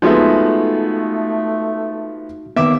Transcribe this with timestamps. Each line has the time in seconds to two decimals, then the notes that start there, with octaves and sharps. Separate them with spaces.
0.02 F3 G#3 A3 B3 D#4 F#4 E5
2.56 D#2 D#3 A#3 B3 E5 D6